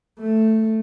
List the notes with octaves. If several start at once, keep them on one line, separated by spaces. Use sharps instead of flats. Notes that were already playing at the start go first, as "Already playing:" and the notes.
A3